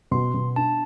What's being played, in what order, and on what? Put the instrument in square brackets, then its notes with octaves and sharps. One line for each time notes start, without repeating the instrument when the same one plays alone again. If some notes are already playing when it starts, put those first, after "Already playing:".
[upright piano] B2 [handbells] C6
[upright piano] B2
[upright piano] D4 [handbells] A5